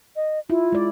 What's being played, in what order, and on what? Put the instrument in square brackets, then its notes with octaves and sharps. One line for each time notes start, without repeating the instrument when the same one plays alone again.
[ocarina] D#5
[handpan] E4 [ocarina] F4
[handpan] G#3 D5